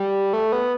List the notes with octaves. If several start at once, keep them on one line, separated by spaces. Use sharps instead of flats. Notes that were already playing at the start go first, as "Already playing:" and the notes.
Already playing: G3
A3
B3